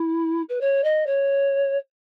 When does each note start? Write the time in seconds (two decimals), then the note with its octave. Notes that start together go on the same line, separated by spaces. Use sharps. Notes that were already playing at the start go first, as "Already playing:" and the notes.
Already playing: E4
0.49 B4
0.61 C#5
0.84 D#5
1.06 C#5